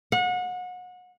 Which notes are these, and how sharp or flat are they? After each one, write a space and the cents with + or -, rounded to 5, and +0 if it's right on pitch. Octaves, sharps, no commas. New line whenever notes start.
F#5 -30